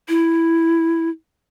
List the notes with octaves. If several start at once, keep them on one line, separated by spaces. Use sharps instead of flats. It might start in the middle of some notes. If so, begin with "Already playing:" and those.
E4